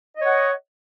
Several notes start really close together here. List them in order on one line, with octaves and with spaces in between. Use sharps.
D#5 C#5 F#5